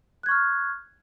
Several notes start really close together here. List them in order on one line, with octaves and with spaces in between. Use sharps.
F#6 G#6 C#6 F6